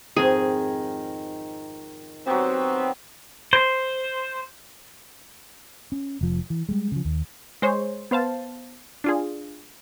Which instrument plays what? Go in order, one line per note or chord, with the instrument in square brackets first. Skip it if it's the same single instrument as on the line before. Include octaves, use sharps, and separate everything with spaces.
[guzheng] F2 G#2 C4 [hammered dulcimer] D#3 [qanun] G#4
[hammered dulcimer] F#3 G4 [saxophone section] B3 C4
[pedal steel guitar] C5
[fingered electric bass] C#4
F1 F3
E3
G3 G#3
C#3 F3
D#2
[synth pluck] G#3 C5 C#5
B3 C5 F5 A5
D4 F4 G#4